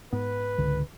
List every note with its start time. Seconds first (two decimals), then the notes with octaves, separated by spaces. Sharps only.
0.13 G#2 B3 B4
0.58 C#2 D3